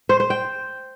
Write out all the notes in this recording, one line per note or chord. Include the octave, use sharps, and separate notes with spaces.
C5
C5
G5